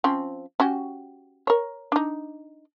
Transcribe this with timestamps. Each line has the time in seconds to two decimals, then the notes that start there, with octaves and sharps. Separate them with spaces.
0.04 F3 C4 C#4
0.60 C#4 F#4 G4
1.47 A#4 C#5
1.92 D4 D#4